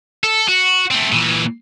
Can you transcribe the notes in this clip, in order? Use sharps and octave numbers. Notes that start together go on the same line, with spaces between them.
A4
F#4
A3 C4
A#2 E3